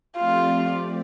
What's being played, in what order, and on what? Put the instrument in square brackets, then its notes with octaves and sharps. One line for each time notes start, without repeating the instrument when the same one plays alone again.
[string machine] F3 A3 C4 G4 D5 [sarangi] F4